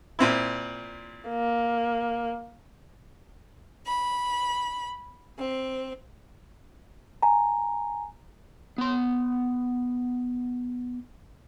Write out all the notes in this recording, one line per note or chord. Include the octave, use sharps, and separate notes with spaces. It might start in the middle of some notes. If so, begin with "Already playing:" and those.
A#2 C4 E4
A#3
B5
C4
G#5 A#5
B3 C6